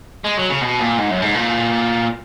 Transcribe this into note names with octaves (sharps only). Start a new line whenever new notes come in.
G#3
F#3
C#3
B2
A#2
G#2
F#2
G#2
A#2